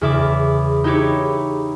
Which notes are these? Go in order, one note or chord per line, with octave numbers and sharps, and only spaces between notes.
E2 C#3 E4 E5 B5 D6
D#4 E4 G4 B4 C#5 D6